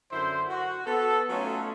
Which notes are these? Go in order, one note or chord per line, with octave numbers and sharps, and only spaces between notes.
F#2 D3 E4 C5
F#4
B3 A4
F#3 A3 C#4 D#4 F4